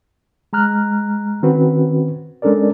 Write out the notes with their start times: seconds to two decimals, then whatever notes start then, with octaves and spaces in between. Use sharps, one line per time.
0.53 G#3 A#5 F6 F#6
1.43 D#3 C4 C#4 F#4 B4
2.42 G#3 C#4 D4 A4 A#4 D5